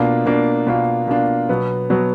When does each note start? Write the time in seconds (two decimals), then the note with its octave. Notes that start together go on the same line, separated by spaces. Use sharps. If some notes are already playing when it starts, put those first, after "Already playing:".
Already playing: B2 A#3 D4 F4
0.26 B2 A#3 D4 F4
0.67 B2 A#3 D4 F4
1.07 B2 A#3 D4 F4
1.49 B2 F#3 B3
1.90 B2 F#3 B3